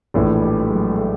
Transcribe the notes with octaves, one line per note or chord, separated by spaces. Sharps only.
A#1 A2 E3
G3
G3
F#3 G#3
G#3
G3 A3